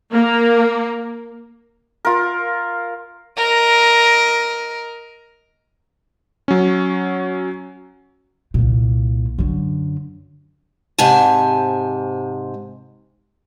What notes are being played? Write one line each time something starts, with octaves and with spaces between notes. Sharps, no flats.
A#3
F4 A#4
A#4 D#5
F#3 C#4
C2 A#2
F#2 D3
G#2 C3 G#5 A5